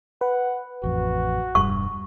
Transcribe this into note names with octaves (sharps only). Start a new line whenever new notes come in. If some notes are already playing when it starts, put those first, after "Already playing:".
B4 F#5
A1 F2 F#4
E1 G2 C#6